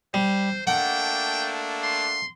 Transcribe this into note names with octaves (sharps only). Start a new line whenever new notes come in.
G3 C5
A3 A#3 D4 F#5 G5
C6